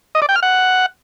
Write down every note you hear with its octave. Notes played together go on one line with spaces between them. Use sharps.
D#5
D5
G5
F6
F#5